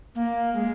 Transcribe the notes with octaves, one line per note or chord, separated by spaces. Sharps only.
A#3
G#3